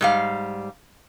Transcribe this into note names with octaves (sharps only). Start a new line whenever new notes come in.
G#2 G3 F5